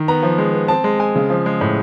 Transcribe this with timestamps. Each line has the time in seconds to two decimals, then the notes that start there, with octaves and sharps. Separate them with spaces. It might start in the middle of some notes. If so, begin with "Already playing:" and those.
Already playing: D#3
0.08 B3 A#5
0.23 F3
0.38 G#3
0.54 B3
0.68 C4 A5
0.84 G#3
0.99 G#3 G#5
1.16 C#3
1.30 F3
1.46 G#3
1.61 A2